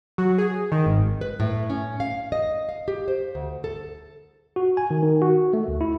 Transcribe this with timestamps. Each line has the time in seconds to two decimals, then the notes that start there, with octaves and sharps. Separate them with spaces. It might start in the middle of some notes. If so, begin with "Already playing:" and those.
0.18 F#3
0.38 G#4
0.72 D#3
0.86 G#1
1.21 B4
1.40 A2
1.70 C#4
2.00 F5
2.32 D#5
2.69 F5
2.88 G4
3.08 C5
3.35 D2
3.64 A4
4.56 F#4
4.77 G#5
4.91 D#3
5.03 D#3
5.22 F#4
5.53 A3
5.68 D2
5.81 E4